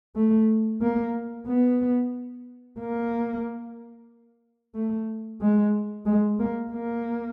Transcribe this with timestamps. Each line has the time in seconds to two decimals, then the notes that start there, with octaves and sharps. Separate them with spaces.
0.16 A3
0.82 A#3
1.47 B3
2.79 A#3
4.75 A3
5.41 G#3
6.06 G#3
6.40 A#3
6.72 A#3